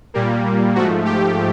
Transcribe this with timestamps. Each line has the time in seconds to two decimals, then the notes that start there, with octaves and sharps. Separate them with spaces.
0.14 A#2 G3 A#3
0.75 G#2 F3 A3 F#4
1.05 G4